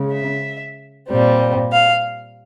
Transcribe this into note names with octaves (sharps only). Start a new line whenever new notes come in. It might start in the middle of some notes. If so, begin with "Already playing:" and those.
Already playing: C#3 G#3
E5
A#2 G3 C4
F5